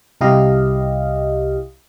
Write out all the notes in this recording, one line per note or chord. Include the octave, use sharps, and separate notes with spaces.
C2 E4 G4 D#5 F5